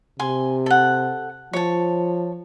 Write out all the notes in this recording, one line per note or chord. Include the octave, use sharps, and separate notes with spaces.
C3 G#5 C6
A4 F#5
F3 C#5 A5